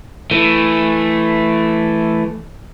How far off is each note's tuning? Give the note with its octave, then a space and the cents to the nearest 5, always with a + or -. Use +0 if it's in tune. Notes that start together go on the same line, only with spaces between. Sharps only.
E3 +5 A3 +0